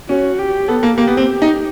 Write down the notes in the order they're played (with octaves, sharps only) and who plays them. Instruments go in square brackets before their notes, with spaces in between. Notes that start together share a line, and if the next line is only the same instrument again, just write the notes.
[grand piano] C#4 [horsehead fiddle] F#4
[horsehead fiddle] G4
[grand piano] B3 [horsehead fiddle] A4
[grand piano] A#3
[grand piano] A#3 [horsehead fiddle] G4
[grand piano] B3
C4
D#4